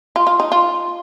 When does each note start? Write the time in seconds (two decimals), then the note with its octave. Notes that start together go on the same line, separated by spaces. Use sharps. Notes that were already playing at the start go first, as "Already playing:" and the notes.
0.16 F4
0.27 F4
0.40 D#4
0.52 F4